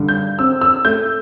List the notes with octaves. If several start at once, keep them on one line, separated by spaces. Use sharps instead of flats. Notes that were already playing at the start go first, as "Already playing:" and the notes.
Already playing: G2 D3
G6
C4 E6
E6
A3 G6